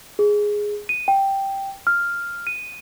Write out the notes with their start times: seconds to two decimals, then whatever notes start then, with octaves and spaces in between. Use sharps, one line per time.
0.19 G#4
0.89 D#7
1.08 G5
1.87 F6
2.47 D#7